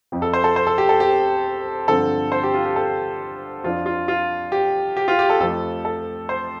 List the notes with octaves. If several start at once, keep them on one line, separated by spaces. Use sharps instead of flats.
F2 F3 C4
A4
C5
A4
C5
A4
G4
A4
G4
G2 D3 F3 C4 A4
C5
G4
F4
G4
A4
F2 F3 D4 F4
F4
F4
G4
G4
F4
G4
A4
F2 F3 A3 A4
A4
C5